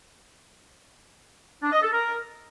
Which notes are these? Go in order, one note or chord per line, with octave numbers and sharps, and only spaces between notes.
D4
D#5
A4
A#4